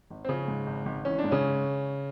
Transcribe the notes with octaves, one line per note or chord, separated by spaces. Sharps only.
G#1
C4
C#3 F3 C#4
G#2
G#1
G#1
E3 C#4
D4
G#2
C#3 C#4